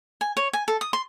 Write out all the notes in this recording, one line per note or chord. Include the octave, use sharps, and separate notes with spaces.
G#5
C#5
G#5
A4
D#6
C6